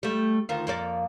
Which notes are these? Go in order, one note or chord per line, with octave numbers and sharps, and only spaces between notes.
G3 A3
D2 D#3 F4
F2 A#3 D5